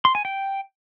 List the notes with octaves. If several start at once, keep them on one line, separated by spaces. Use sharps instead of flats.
C6
G#5
G5